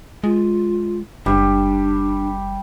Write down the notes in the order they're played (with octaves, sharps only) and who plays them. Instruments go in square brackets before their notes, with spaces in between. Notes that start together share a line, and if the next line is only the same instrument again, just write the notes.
[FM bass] G#3 [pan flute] F4
[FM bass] F#1 [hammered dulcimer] G3 [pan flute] D4